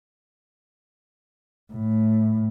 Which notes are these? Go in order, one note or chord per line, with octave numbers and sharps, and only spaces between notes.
A2